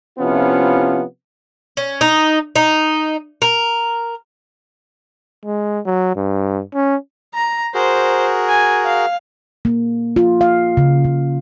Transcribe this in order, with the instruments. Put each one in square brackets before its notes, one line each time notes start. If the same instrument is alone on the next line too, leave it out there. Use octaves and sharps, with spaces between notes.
[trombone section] C3 F3 B3 C#4 E4 F4
[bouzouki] C#4
D#4
D#4
A#4
[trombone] G#3
F#3
G2
C#4
[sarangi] A#5
[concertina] F#4 G#4 A#4 [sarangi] C5
[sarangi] G#5
F5
[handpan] A#3
F4
F5
C#3
C#3